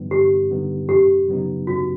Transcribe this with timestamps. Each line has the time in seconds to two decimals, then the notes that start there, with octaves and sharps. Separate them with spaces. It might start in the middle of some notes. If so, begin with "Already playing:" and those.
Already playing: G2 D3 G3 B3 D#4
0.11 G2 G4
0.50 D3 G3 B3 D#4
0.89 F#2 G4
1.28 C#3 F#3 B3 D#4
1.67 F#2 F#4